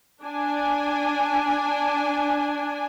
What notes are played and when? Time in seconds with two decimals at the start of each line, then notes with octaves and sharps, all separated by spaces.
0.24 D4 G#5